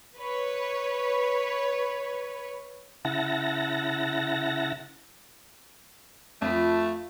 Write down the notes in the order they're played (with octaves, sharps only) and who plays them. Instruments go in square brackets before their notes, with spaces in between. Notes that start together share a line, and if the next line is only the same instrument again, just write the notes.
[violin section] B4 C#5
[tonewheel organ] C#3 E4 F#5 A5 A#6
[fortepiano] F2 [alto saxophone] A3 [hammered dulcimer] F4 B5